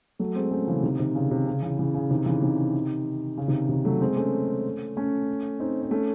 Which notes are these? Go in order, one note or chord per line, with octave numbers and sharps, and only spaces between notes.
F#3 A3
G#3 C4
A3 C#4
C#3 E3
C3 D#3
C3 D#3
C#3
C3
C#3
C#3 E3
C#3 E3
C#3
C3 D#3
C#3 E3
C3 D#3
C#3
C3 D#3
C3 D#3
F#3 A3
G#3 C4
A3 C#4
A3 C#4
C4 D#4
C4
A3 C#4